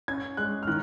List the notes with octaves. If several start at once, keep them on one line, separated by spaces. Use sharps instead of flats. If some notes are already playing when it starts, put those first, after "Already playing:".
C#4 G#6
G#3 F#6
F6
D#3 F#6